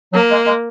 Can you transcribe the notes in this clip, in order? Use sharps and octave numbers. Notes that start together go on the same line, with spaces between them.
F#3 A#3
G#3
G#3